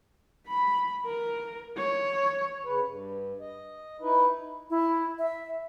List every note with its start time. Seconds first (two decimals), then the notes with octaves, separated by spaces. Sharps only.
0.48 B5
1.06 A#4
1.77 C#5
2.63 C#3 B4
2.86 G2
3.40 D#5
4.01 D#4 E4 B4
4.70 E4
5.19 E5